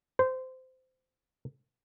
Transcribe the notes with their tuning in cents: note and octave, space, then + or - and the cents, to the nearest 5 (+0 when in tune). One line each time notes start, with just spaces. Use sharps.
C5 -20